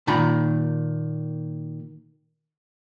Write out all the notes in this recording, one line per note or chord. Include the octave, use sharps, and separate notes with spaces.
A#2 D#3 A#5 B5